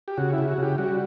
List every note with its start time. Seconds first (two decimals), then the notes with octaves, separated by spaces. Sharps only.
0.08 G4
0.18 C#3 F#4
0.33 E4
0.38 C#3
0.48 F#4
0.58 C#3 G4
0.78 G3 F#4